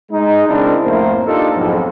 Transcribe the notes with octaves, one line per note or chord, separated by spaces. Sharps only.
G#3 D#4
C#3 C4 D4 E4 A#4
F2 A2 A3 A#3 A#4 C5
A#3 D4 D#4 F4 G4 A4
B1 F2 G#2